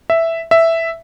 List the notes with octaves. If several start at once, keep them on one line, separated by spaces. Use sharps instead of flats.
E5
E5